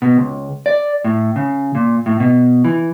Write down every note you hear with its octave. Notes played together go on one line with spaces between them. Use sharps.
B2
C#2
D5
A2
C#3
A#2
A2
B2
E3